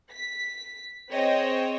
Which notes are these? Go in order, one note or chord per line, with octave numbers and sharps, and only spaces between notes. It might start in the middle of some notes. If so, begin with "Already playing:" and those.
B6
C4 G#4 C5 C#5 D#5 G5